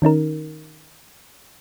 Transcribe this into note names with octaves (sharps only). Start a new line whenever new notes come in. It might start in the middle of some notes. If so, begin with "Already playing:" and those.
D#3 C#4 D#4 A#4